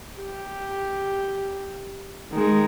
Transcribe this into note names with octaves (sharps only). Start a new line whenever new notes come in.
G4
D#3 G#3